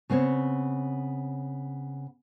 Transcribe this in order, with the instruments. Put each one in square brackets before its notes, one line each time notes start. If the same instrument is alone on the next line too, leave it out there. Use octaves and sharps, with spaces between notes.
[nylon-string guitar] C#3 B3 C4 C#5